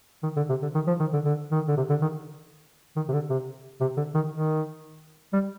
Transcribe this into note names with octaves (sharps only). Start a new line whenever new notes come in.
D#3
D3
C3
D3
D#3
F3
D#3
D3
D3
D#3
D3
C3
D3
D#3
D#3
C3
D3
C3
C3
D3
D#3
D#3
G3